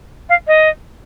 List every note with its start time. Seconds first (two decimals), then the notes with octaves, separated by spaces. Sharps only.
0.29 F5
0.47 D#5